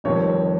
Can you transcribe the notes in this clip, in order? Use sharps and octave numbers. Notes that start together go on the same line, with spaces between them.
F1 F2 D#3 G3 C#5